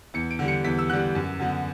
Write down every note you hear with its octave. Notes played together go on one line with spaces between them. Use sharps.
E2 C#7
D7
D3 G3
C#7
E2 B6
E6
D3 G3 F#6
F#2
D3 F#3 B3